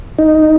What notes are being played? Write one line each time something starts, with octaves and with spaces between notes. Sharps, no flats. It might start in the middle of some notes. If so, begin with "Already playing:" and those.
D#4